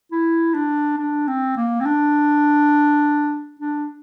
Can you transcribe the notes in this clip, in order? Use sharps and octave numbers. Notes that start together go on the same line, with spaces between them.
E4
D4
D4
C4
A#3
C4
D4
D4